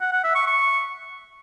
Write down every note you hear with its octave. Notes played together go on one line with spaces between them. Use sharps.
F#5
F#5
E5
C#6
C#6